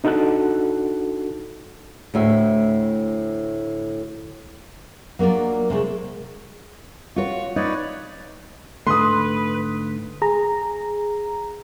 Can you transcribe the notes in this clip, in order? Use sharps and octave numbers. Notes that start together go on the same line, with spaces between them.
D4 D#4 F#4 A4 A5 F#6
D2 A2 E5
F#3 A#3 D4 F4 D5
C3 G#3 A3
F4 F#4 C#5 C#6
D#4 B4 C#5 D5
G#2 D3 A3 B4 C6 D#6
G#4 A#5